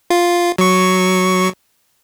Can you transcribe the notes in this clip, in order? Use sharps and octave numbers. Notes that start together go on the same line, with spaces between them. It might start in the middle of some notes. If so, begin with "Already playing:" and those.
F4
F#3 C#6